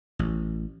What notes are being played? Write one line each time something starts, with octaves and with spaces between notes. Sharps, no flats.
A1